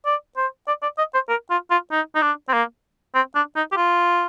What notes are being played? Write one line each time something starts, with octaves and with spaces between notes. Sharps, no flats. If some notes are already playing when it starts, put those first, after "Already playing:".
D5
C5
D5
D5
D#5
C5
A#4
F4
F4
D#4
D#4
D4
C4
A#3
C4
D4
D#4
G4
F4